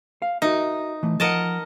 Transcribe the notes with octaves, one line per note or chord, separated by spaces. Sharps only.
F5
D#4 F#4 A#4 E5
E3 A3
F3 A#4 D#5 F#5 A5